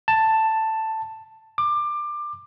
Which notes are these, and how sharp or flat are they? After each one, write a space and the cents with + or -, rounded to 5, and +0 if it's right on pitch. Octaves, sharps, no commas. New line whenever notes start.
A5 +5
D6 +20